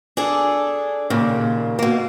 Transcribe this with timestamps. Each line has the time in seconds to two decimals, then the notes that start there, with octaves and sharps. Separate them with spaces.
0.17 D4 G#4 A4
1.10 D#2 A#2 C#3
1.79 B2 A#3